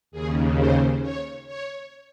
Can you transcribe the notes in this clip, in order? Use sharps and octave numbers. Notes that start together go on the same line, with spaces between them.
D#2 C#3 G#4
C5
C#5
C#5